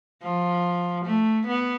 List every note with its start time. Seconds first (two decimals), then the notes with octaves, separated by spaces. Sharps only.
0.22 F3
1.05 A3
1.47 B3